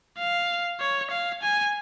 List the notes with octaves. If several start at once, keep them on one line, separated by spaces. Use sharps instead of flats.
F5
C#5
F5
G#5